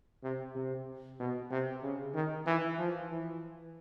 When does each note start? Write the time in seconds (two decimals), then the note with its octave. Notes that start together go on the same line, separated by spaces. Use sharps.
0.23 C3
0.55 C3
1.20 B2
1.51 C3
1.83 C#3
2.14 D#3
2.46 E3
2.78 F3
3.10 E3